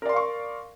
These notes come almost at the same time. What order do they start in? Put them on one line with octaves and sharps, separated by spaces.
A#4 D5 C6 F5 C#6